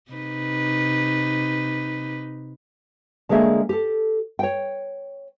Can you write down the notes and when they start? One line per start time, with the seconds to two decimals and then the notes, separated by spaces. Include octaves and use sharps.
0.11 C3 D#4 B4
3.29 D3 G#3 A#3 G#4 E5
3.69 G4 A4
4.39 C#5 G5